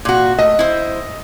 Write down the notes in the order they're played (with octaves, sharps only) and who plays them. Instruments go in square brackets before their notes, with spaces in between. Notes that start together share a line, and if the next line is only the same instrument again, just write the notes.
[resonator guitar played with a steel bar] A#2 F#4
[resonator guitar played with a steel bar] A3 [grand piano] D#5
[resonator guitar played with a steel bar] E4 C5